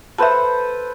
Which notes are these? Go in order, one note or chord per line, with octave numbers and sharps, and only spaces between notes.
A4 B4 C5 E5 A5